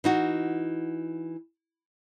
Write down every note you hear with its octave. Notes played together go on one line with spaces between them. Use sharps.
E3 D#4 F#4